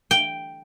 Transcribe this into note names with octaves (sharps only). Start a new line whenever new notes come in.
G5